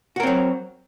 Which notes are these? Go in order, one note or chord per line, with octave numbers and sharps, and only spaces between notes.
F#3 C4 F#4 A#4